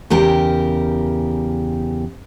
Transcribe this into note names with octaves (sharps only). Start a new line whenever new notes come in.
E2 C#3 G4 A#4 G5